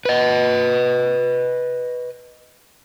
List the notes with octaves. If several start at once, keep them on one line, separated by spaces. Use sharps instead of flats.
B4 D#5